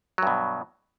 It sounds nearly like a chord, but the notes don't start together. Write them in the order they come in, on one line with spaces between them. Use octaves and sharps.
F#3 G2 B2